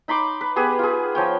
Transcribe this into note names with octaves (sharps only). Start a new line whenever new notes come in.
D#4 B5 C6 D6
B4
B3 G4 G#4 B4
F4 G#4
F3 C#5 G5